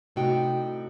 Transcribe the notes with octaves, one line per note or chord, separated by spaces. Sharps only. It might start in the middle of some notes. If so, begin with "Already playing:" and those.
A2 C3 D4 D#4 F#4 G5